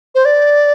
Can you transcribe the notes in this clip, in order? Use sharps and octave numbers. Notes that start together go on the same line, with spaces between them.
C5
D5